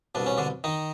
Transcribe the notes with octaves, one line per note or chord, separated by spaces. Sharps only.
C2 B2 D4
C#4
D3 D4
D#3 D#4